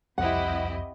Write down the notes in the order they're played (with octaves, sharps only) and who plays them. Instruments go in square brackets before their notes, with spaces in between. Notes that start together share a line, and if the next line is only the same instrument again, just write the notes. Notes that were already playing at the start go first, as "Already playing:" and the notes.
[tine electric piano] C2 F2 [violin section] C4 E4 [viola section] G4 D#5 [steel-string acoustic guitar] F#5